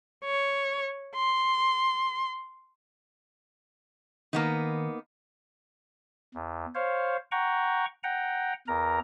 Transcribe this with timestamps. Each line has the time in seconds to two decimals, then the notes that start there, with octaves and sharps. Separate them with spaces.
0.25 C#5
1.16 C6
4.33 D#3 A#3 B3 D#4
6.35 E2
6.75 C5 C#5 F5
7.32 F#5 G5 A#5 C#6
8.03 F#5 G5 A#5
8.68 E2 A#4 A#5